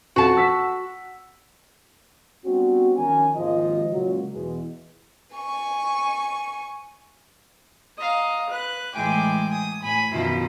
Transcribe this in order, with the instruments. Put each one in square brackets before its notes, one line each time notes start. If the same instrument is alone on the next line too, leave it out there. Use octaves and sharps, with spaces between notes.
[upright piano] F2 [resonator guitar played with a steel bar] F#4 A5
[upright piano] F#5 E6 B6
[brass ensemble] G3 B3 C4 D4 F#4
D#3 F3 C#4 A#4 G#5
G#1 D#2 F3 D#5
C#2 A#2 F#3
E2 B2 E3 G#3
[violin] G#5 C#6
[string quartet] D#5 F5 A#5
B4 F#6
A2 E3 G#3 G5 G#5 D6
G#5 D#6
A2 G#5 B5
F#2 B2 D#3 F3 E4 F4